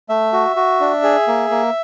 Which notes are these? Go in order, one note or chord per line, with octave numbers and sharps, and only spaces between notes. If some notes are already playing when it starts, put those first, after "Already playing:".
A3 E5
F#4
F#4
D4
G#4
A#3
A#3